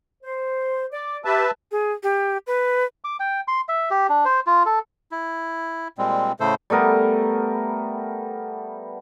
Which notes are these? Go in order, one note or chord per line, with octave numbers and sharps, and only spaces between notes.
C5
D5 D6
G4 B4 E5 A5
G#4
G4
B4
D6
G5
C6
E5
G4
D4
C5
F4
A4
E4
A#2 G3 G#3 C4
A2 C#3 A3 A4 C5
G3 A3 B3 A#4